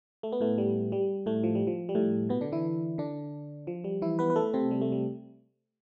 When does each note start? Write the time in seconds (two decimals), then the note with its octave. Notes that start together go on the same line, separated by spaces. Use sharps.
0.23 A3
0.32 B3
0.41 A2 A3
0.58 G3
0.92 G3
1.26 A2 A3
1.43 F3
1.55 G3
1.67 F3
1.89 G3
1.95 A2 A3
2.29 B2 B3
2.41 D3 D4
2.52 E3 E4
2.98 D3 D4
3.67 F3
3.84 G3
4.02 E3 E4
4.19 B3 B4
4.30 B4
4.36 A3 A4
4.54 C3 C4
4.71 G3
4.81 A3
4.92 G3